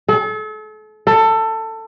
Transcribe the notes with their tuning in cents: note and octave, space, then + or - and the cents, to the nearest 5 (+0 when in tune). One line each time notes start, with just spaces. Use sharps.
A4 -40
A4 +20